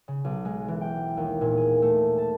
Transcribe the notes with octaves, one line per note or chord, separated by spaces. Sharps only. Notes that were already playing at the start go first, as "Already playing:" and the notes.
C#3
B1
G#3
E3
G5
D#2
A#2
G#4
A3
A5